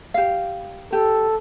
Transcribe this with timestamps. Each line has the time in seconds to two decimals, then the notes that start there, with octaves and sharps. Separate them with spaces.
0.14 G4 F5
0.92 G4 A4